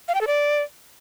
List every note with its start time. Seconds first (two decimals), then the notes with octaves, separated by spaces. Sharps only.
0.08 F5
0.15 G5
0.21 A4
0.27 D5